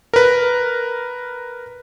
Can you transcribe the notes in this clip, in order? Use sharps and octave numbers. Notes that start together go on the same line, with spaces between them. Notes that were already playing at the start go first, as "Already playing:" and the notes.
A#4 B4